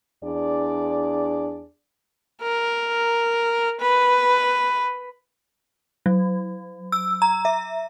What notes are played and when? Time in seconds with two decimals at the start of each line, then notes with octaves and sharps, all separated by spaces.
0.24 E2 D4 G#4 D5
2.42 A#4
3.80 B4
6.06 F#3
6.92 E6
7.22 A#5
7.45 E5